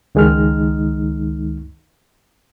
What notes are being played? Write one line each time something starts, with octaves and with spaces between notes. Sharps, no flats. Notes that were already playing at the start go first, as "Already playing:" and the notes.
C#2 D#3 G#3 D#4 F6